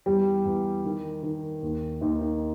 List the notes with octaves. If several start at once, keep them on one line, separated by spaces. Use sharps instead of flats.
E2 G3 G4
E2
D#3
D#3
D#2
D#2 D#4
D#4